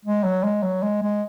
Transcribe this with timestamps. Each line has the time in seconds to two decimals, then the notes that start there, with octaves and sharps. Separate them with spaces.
0.05 G#3
0.24 F#3
0.44 G#3
0.63 F#3
0.83 G#3
1.02 G#3